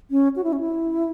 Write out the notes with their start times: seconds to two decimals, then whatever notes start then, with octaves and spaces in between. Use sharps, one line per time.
0.11 C#4
0.36 F#4
0.44 E4
0.53 C#4
0.60 E4